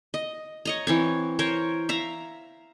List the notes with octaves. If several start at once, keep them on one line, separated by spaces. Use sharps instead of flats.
D#5
C#5 D#5 A#5
E3 C4 C#5
A#4 C5 C#5
E5 F5 A#5